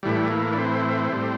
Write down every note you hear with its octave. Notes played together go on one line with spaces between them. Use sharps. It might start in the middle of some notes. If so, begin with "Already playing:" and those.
A2 E3 G3
A#3
D4
C4
A2 G3